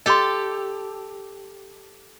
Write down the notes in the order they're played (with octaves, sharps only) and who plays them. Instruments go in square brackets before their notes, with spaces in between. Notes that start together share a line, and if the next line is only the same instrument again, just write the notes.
[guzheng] G4 A4 [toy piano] D#5 C6